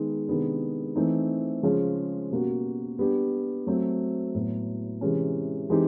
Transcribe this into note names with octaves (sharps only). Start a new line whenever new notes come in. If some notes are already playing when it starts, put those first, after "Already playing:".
Already playing: D#3 G#3 B3 D#4
C3 D#3 G#3 B3 D4
E3 A3 C4 D#4
C#3 F3 G#3 C#4
B2 G3 A#3 C#4 F#4
G3 B3 D4 G4
F#3 A3 C4
A2 F#3 B3
C3 E3 G#3 C#4
E3 G#3 C4 D#4 G4